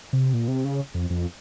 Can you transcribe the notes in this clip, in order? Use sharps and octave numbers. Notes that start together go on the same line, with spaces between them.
C3
A#2
C3
C#3
F2
F2